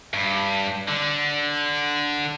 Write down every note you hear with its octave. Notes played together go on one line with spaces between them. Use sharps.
G2
D3